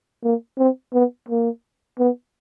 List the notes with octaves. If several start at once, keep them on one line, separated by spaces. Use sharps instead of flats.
A#3
C4
B3
A#3
B3